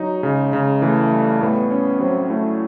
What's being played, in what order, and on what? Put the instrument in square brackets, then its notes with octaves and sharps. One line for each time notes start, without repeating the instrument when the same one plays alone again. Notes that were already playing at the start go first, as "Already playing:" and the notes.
Already playing: [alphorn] F#3 [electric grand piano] D#4
[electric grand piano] C#3 [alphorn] G#3
[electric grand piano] C#3
[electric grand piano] E3 [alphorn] A3
[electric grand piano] G3
[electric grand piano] A2 [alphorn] B3
[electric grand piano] C#4
[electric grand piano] F#3 [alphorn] C4
[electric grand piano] A3 [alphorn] E4